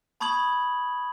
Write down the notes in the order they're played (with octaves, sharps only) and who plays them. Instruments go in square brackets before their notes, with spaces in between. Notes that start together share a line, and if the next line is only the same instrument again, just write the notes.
[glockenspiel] A5 B5 C#6 D#6 G#6 F#7